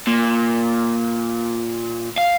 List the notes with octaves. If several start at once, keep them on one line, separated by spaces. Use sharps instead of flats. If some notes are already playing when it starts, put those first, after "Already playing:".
A#2
F5